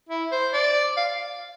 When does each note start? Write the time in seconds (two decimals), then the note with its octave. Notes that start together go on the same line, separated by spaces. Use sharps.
0.09 E4
0.31 C5
0.53 D5
0.97 F5